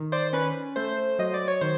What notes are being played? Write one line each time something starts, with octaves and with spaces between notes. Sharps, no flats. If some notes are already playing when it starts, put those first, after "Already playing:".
Already playing: D#3
C5 D5
C#4 B4
A3 C5
F#3 D#5
D5
C#5
D#3 C5